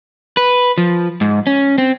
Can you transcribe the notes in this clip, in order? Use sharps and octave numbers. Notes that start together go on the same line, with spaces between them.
B4
F3
G#2
C#4
C4